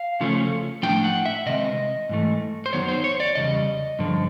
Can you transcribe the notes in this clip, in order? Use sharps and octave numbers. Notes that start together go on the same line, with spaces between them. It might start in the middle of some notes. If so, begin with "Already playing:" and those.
Already playing: F5
C#3 F3 A3 C#4
A2 F3 A3 D4 G5
F#5
E5
C3 D#3 G#3 C4 D#5
G#2 E3 A3
C5
F#2 D#3 F#3 B3 D#4 C#5
C5
C#5
D5
E2 C#3 G3 D#5
G2 D3 F3